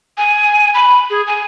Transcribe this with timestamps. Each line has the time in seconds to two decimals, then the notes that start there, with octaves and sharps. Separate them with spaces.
0.18 G#5
0.74 B5
1.10 G#4
1.27 G#5